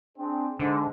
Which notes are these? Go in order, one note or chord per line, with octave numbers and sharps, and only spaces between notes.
C4 D4 G#4
G#2 D3